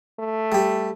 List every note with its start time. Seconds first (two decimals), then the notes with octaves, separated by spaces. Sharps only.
0.19 A3
0.52 G3 G4